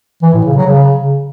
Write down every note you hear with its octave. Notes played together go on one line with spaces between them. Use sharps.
E3
A2
C#3
F#3
C#3